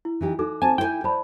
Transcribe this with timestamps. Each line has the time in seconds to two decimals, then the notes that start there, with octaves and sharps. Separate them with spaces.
0.05 E4
0.21 E3 D#4 G4
0.39 D#4 F#4 A4 D6
0.62 C4 G#5 A5
0.78 E4 C5 G5 G#5
1.04 C5 D5 A5 B5